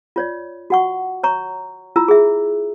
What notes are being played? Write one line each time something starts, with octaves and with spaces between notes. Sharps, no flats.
F4 C#5 D5
F#4 F#5 C#6
C#5 A#5 C#6
E4 F4 A#5 E6
G#4 E5